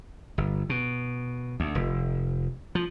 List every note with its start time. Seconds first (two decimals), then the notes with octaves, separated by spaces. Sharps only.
0.38 G1
0.70 B2
1.60 D2
1.75 F1
2.75 F3